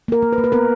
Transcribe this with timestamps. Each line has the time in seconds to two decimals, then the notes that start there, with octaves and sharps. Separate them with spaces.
0.08 A#3 A#4
0.22 A#3
0.33 B4
0.38 A#3
0.44 B4
0.52 B3 A#4